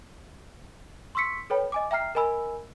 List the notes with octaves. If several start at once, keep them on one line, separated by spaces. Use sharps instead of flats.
C6 C#6 E6 B6 C#7
A4 B4 C#5 G5 B5
D#5 G#5 D6
E5 G5 A#5 F6 C7
A#4 D#5 G#5 B5 E6